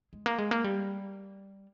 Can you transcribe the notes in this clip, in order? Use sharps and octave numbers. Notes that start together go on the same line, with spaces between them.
G#3
A#3
G#3
A#3
G3